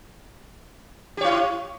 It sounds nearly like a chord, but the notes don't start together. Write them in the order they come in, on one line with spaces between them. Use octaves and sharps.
G4 C#5 E4